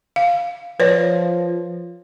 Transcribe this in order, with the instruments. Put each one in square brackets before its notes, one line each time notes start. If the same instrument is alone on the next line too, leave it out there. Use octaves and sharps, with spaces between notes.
[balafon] F5
[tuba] F3 [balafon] B4 C#5 D5